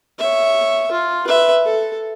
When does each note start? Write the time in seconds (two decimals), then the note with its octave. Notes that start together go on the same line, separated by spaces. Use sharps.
0.19 C#5 E5
0.92 F4
1.27 B4 E5
1.65 A4